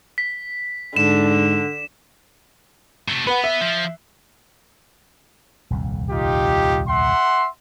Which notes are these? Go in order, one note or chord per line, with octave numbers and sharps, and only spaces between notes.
B6
G#2 D3 E7
C3 A3
B3 B4 F#5
E5
F3
D#1 C2 F2
D#4 F4 G4
E5 F#5 C6